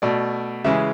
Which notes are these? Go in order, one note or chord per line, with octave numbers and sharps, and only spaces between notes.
B2 A3 D5
C#3 E3 G#3 E5